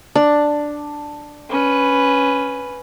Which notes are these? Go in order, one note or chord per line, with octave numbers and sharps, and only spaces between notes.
D4
C#4 B4